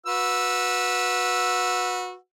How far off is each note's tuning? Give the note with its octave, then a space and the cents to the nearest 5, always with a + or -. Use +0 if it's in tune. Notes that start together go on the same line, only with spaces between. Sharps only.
F#4 -25 B4 -15 E6 +0